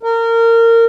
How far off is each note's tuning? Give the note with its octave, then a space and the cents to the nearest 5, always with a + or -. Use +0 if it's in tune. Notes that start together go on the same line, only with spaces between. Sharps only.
A#4 -25